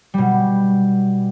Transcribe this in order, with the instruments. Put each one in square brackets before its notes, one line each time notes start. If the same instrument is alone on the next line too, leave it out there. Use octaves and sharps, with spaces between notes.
[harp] B2 G3